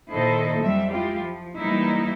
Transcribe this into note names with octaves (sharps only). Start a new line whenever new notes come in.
A#2 D#3 E4 A4 C5 D#5
F2 F#3 G3 C4 E5
G#3 E4 F4 G4
F3
E3 G3 G#3 A#3 D#4 E4